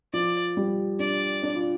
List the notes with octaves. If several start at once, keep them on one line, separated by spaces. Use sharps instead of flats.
F3 D5
G3
D4 D5
D4
F4